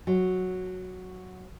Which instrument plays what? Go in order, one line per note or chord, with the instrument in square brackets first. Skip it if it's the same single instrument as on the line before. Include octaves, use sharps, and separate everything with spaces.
[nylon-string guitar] F#3